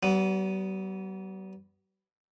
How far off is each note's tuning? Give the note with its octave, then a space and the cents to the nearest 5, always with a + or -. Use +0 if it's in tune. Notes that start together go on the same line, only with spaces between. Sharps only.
G3 -45 B3 +5